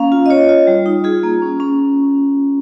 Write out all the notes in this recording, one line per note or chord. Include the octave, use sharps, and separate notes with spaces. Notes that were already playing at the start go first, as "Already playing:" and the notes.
Already playing: A#3 C#4 F5
F4
D#5
F4 C#5
F4
G3
D#4
F4 G#4
A#3
C#4
C#4